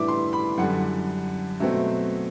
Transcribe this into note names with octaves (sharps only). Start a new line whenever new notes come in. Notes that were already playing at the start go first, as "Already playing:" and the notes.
Already playing: A2 E3 G3 D4 E5 D6
C6
B5
F#2 D3 G3 F#5
B2 F#3 A3 C4 E5